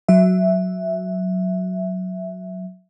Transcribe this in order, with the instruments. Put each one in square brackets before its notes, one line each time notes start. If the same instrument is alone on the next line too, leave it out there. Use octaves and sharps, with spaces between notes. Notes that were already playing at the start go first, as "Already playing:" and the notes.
[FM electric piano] F#3 E5